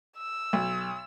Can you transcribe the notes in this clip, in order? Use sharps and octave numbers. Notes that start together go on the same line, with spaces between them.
E6
B1